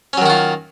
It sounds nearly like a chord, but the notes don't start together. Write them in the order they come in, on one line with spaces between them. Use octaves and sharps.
C#4 F#3 D#3 F#4 F4